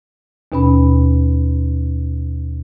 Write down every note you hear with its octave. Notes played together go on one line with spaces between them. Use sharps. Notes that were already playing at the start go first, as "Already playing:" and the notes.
D#2 B2 C#4 B5